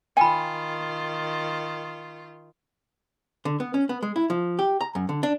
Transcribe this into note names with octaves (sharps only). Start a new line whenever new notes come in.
D#3 F4 G5 G#5 B5
D3
B3
C#4
B3
G#3
E4
F3
G4
A#5
F#2
D3
D4